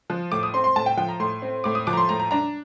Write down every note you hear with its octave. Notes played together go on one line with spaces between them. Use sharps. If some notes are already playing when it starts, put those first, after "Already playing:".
F3
A2 D6
D#6
C4 C6
C6
A2 A5
G5
F3 G5
A#5
A2 C6
C4
A2 D6
D#6
F3 D6
A#5
C6
A2 A#5
A#5
D4 A#5